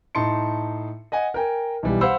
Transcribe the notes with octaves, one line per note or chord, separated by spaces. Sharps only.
A2 D#4 A5 C6 C#7
D#5 F#5 G#5
A#4 G5 G#5
B1 E3 G3
C5 F5 F#5 B5 E6